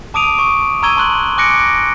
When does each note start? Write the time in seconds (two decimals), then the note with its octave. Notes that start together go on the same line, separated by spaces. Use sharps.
0.14 A5 D6 D#6 D7 D#7 F7
0.39 C#6
0.83 A#5 C#6 E6 G#6 D#7 G7
0.97 A5 C6 F#6 F#7
1.38 G#5 D6 F#6 A#6 C#7 D7